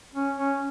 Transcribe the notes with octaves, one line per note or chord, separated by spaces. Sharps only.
C#4
C#4